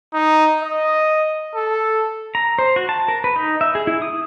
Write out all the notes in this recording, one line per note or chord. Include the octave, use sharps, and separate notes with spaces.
D#4
D#5
A4
A#5
C5
F#4
A5
A#4
B4
D#4
E5
G#4
E4
D#6